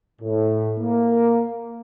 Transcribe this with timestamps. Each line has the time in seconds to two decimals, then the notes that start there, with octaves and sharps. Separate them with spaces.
0.21 A2
0.78 A#3